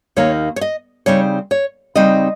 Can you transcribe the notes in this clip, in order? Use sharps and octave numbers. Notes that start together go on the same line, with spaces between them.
D#2 D#3 A#3 D#4 C#5
C#5
D#5
C#3 G3 C4 D#4 C#5
C#5
C#3 G3 C4 D#4 D#5